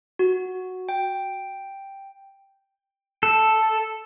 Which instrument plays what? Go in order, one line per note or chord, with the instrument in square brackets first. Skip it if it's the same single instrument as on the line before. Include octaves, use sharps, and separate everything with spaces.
[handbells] F#4
G5
[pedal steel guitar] A4